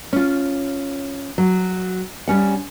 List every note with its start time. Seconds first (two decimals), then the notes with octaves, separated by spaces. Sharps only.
0.13 C#4 F4
1.38 F#3
2.28 G3 C#4 F#5